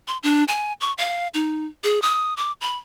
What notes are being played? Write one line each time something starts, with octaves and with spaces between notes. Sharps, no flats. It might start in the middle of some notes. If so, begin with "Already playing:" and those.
C6
D4
G#5
C#6
F5
D#4
G#4
D#6
D6
B5